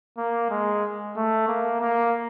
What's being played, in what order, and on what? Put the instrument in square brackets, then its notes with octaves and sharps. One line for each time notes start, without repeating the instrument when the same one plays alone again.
[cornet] A#3
G#3
A3
A#3
A#3